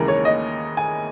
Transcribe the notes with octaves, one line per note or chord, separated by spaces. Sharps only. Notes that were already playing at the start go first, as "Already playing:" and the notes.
Already playing: D#2 C#3 E3 G#3 A#4
C#5
D#5
G#5